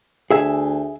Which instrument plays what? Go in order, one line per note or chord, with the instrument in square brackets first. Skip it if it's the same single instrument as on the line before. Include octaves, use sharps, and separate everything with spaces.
[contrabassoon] D2 [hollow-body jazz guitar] G#4 E5 G#5